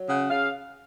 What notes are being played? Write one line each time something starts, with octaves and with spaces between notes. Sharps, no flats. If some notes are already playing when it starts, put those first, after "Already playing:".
Already playing: F#3
C#3 F#5
C#3 F5